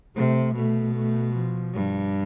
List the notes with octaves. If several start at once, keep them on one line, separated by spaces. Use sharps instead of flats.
C3 A3
B2 A3
A3
F3
G2